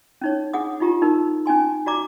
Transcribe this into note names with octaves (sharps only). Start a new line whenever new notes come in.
C#4 D#4 C#5
D4 G#4 F#5 D#6
D#4 F4 G4 A#5
D#4 A#4
C#4 D#4 G#5 C6
F#4 D5 A#5 D6